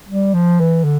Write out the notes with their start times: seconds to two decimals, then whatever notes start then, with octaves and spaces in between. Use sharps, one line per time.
0.09 G3
0.34 F3
0.60 E3
0.84 D3